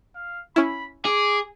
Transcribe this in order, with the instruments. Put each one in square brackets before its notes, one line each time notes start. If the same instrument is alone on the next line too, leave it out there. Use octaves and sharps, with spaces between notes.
[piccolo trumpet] F5
[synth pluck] C#4 E4 [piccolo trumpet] B5
[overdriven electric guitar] G#4 [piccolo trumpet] D6